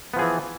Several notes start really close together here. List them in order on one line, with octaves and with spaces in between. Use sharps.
B3 F3 G#4 E3